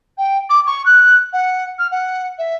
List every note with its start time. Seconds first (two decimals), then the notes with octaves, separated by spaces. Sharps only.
0.18 G5
0.50 D6
0.67 C#6
0.86 F#6
1.33 F#5
1.79 F6
1.91 F#5
2.38 E5